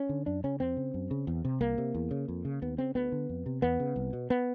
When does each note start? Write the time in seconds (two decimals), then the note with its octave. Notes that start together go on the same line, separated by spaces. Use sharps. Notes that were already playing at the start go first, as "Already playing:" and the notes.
Already playing: C#4
0.09 D3
0.26 F#2 D4
0.44 C#3 C#4
0.60 F2 C4
0.77 C#3
0.94 F#2
1.11 C#3
1.27 E2
1.45 C3
1.61 C2 A#3
1.78 C3
1.94 E2
2.11 C#3
2.28 F2
2.45 C#3
2.62 D#2 B3
2.78 C#3 C4
2.95 D2 B3
3.12 D3
3.29 F2
3.46 C3
3.62 E2 B3
3.80 C#3
3.96 C2
4.13 B2
4.30 B3